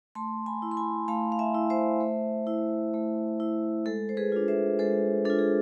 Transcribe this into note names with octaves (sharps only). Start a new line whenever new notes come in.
A3 A5 C6
G#5 B5
E4
C6
G#5 B5
A3 F5 A5
F5
E5 G#5
E4
C5 E5
A3
E4
A3
E4
G#3 A4
C5
G#4 B4
D4 F4
C5 E5
G#3 A4 C5
D4 F4 A4
G#4